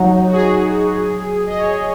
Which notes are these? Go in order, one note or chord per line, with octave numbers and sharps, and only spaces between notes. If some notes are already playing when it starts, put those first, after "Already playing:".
Already playing: F#3 D#4
F#4
G#4
D#5
C#5